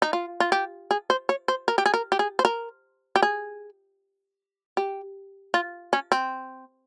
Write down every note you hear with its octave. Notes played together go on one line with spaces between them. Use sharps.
D#4
F4
F4
G4
G#4
C5
C#5
C5
A#4
G4
G#4
A#4
G4
G#4
C5
A#4
G4
G#4
G4
F4
C#4
C4